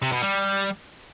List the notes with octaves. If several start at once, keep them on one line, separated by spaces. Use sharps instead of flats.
C3
B2
G3